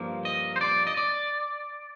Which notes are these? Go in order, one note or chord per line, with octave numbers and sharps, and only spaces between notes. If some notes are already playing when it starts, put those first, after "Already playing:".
Already playing: G2 F3 A#3
D#5
C5
D5
D#5
D5